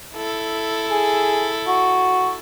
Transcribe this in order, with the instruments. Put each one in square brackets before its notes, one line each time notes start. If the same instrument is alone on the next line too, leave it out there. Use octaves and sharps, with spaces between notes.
[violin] E4 A4
[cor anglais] G#4
F#4